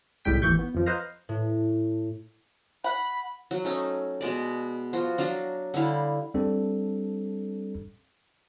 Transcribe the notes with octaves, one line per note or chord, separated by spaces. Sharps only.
C2 A2 G3 G#3 G5 B6
G#1 D#2 E3 C#6 G6
B3
F2 F3
B4 C5 D#5 F5 A#5
A2
F#5 B5
F#3
A3 C#4 D#4
B2 G#3 D5
F3 F4 F#4
F#3 D4 F5 A#5
D3 G3 E4 F5
G3 C4 D4 A4